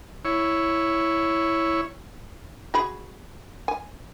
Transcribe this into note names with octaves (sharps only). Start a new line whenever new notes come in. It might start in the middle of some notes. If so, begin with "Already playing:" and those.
E4 C#5
F#4 G#4 B5
G#5